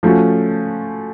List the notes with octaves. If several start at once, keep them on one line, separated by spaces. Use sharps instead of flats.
F3 A3 C#4 F#4